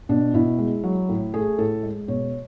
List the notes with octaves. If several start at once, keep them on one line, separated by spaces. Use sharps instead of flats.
B2 D4
B2 E4
G#3
F#3
A2
A3 G#4
A2 A4
G#3
B2 C#5